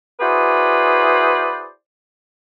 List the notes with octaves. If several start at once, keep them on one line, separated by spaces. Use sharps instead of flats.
E4 F#4 G#4 B4 C5 D5